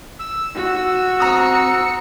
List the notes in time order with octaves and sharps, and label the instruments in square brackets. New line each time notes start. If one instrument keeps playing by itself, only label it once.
[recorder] E6
[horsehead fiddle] F#4
[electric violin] C4 C#7 [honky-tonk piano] A#5 D#6